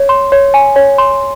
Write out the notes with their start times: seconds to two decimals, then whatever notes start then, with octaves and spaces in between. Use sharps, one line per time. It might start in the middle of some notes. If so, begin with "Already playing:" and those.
Already playing: C#5
0.09 C6
0.32 C#5
0.54 G#5
0.76 C#5
0.98 C6